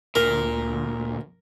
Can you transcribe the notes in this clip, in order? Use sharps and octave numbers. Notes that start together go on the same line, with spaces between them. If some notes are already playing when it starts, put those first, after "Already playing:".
D2 A#2 A#4